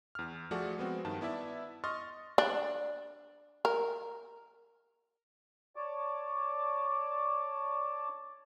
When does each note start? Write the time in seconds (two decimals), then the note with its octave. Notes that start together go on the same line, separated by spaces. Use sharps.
0.15 E2 F6
0.51 F3 A3 F#4 G#4 A4 D5
0.78 G#3 B3 C4 F#4
1.05 G2 D#3 A5
1.21 B3 E4 D5 E5 A5
1.84 D#5 C6 C#6 D#6 F6 A6
2.38 D4
3.65 A#4
5.76 C#5 D5 A5 D6